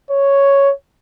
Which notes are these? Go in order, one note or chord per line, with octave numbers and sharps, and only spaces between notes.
C#5